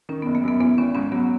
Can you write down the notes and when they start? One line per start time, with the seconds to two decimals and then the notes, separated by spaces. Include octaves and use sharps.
0.09 D#3 C#4
0.22 F#1 B3
0.35 A#3
0.44 F#2 B3
0.60 E3 B3
0.78 G#1 C#4
0.95 G#2 C#4
1.12 F#3 B3